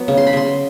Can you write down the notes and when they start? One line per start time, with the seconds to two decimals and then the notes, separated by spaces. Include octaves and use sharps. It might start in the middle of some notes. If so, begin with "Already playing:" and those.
Already playing: F#3 B3
0.08 C#3
0.17 C6
0.27 B5
0.33 C#3 C6